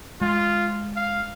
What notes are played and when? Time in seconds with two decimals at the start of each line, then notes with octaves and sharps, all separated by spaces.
0.21 G#3 F4
0.96 F5